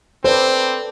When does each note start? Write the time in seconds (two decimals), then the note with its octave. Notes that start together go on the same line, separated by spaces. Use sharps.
0.24 C4 A4 B4 C5 D5